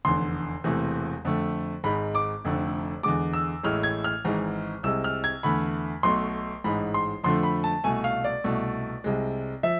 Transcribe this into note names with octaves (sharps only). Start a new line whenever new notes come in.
F1 E2 D3 C6
E1 E2 C3 E3 A3
F2 D3 A3
G#1 G#2 G#3 B5
D6
F1 F2 D3 A3
E2 D3 G#3 D6
E6
A1 A2 G#3 F6
G#6
F6
G#1 G#2 E3 G#3
C2 C3 G#3 E6
F6
G#6
E2 D3 A3 B5
B1 B2 A3 C6
A1 G#2 G#3 B5
C6
F2 D3 F3 A3 C6
B5
A5
C2 B2 A3 G#5
F5
D5
C2 B2 A3
C2 C3 G#3
F3 E5